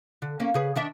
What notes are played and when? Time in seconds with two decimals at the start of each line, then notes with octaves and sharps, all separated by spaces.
0.22 D3
0.40 A#3 C#4
0.54 C#3 G#4 B4
0.76 D#3 D4 E5